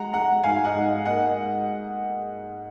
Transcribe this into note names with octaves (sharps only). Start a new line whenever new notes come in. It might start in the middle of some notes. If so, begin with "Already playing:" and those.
Already playing: G#3 F#5 A#5
G#3 F#5 A#5
G#2 F5 G#5
D#5 F#5
G#2
A#3 D#5 F#5